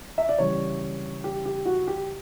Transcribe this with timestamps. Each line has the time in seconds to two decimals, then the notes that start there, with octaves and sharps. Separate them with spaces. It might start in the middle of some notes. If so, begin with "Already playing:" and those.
0.18 E5
0.29 D5
0.38 C#3 E3 G3 C#5
1.24 G4
1.45 G4
1.65 F#4
1.88 G4